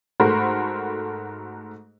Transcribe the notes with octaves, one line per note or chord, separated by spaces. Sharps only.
G#2 A3 F#4 A#4 C5 B5